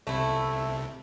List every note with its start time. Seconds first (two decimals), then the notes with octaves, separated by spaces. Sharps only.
0.07 C2 C3 A3 E4